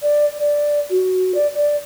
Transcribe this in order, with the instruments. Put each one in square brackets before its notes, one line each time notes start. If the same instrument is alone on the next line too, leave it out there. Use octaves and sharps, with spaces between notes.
[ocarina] D5
D5
F#4
D5
D5